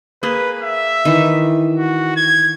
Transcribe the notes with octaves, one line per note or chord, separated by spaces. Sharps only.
A#3 G#4 B4
E5
D#3 E3
F#4
G#6